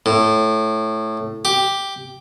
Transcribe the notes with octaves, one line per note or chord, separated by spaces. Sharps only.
A2
G4